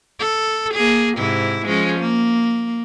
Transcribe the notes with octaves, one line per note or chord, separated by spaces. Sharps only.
A4
A#3 G#4
G#2 C3 E4
F3 G#3 C#4
A#3